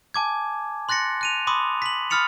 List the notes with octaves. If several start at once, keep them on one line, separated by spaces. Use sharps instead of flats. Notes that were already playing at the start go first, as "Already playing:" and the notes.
G#5 A5 D6 G#6
C6 F#6 A6 A#6 C#7
F#6 D#7 F7
B5 C6 D6 D#6
B6 F#7
B5 D#6 F6 A6 C#7 F7